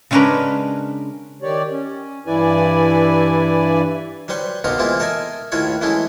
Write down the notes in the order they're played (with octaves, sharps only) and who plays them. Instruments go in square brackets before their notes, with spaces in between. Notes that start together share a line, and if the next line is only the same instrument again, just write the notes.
[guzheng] C#3 G#3 C#4 D4 A#4 B4
[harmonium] D#3 G4 C#5 D5
C#4
G2 E3 E4 B4 D5 G#5
[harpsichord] F#3 G3 B4 C5 F#5
B1 B2 A#3 B3 A#5 C6
E3 G#3 A#3 C4 E4 F4
A4 A#4 D#5 E5 G#5
D#2 A2 E4 F4 B4 C#5
E3 F#3 G#3 A3 C#4 E4